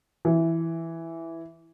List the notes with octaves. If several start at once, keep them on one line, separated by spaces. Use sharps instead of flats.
E3